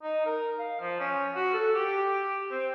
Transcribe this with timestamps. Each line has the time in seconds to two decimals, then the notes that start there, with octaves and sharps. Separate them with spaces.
0.03 D#4
0.26 A#4
0.58 F5
0.80 F3
1.00 C#4
1.36 F#4
1.54 A4
1.75 G4
2.51 C4